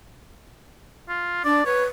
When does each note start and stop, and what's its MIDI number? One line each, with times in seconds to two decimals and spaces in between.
1.08 1.41 65
1.45 1.65 62
1.45 1.65 74
1.66 1.85 71
1.66 1.84 73